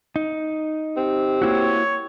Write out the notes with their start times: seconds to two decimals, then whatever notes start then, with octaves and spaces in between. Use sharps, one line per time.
0.16 D#4
0.97 C4 G4
1.42 A#3 E4 F#4 C#5